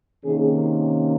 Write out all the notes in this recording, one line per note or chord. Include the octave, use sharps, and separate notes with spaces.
C3 D#3 A#3 C#4 G#4